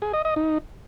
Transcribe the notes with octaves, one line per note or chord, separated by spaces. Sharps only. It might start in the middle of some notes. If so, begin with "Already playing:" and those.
G#4
D#5
D#5
D#4